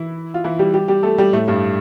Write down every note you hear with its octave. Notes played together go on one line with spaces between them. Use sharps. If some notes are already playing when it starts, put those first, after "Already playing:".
Already playing: E3 E4
F4
E3 E4
G3 G4
G3 G4
G3 G4
A3 A4
G3 G4
A2 A3
G2 G3